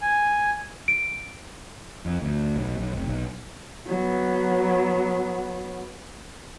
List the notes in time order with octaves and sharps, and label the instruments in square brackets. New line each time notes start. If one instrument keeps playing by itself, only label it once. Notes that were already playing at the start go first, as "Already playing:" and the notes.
[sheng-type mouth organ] G#5
[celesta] D7
[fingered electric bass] F2
D2
B1
B1
F1
B1
[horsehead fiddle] F#3 B3